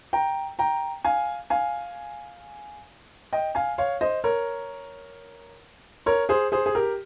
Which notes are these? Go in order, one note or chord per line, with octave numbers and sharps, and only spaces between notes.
G5 A#5
G5 A#5
F5 G#5
F5 G#5
D#5 G5
F5 G#5
C#5 F5
C5 D#5
A#4 C#5
A#4 C#5
G#4 C5
G#4 C5
G#4
G4 A#4